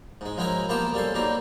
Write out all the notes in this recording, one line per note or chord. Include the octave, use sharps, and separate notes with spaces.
G#2 G#3
F3 F#3 G#3 E4 A#4 D#5
A#3 B3 F4 G4 D#5 A5
G3 C#4 A4 C5
F#3 G3 A#3 C4 D#4